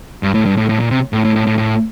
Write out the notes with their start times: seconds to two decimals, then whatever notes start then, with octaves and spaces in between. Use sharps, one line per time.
0.23 G2
0.35 A2
0.45 G2
0.57 A2
0.69 A2
0.80 A#2
0.91 C3
1.13 A2
1.25 A2
1.36 A2
1.47 A2
1.58 A2